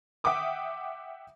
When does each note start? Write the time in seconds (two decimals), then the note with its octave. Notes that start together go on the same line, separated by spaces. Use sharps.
0.24 E5 F#5 G5 D6 D#6